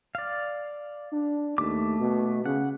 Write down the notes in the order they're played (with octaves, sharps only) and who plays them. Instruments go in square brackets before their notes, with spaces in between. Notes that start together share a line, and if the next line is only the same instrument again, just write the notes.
[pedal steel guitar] D5 F5
[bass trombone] D4
[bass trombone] D#2 [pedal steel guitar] A3 D6
[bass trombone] B2
[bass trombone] C#3 [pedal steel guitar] F#5